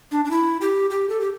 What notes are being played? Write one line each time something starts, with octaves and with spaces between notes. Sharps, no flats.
D4
D4
E4
G4
G4
A4
G4